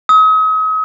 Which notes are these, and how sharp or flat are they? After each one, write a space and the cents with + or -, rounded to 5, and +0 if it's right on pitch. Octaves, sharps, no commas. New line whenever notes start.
D#6 +40